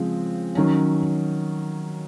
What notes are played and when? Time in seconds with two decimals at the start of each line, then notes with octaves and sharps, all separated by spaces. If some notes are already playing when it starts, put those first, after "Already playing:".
Already playing: C#3 F3 G#3 C4
0.55 D#3 F#3 C#4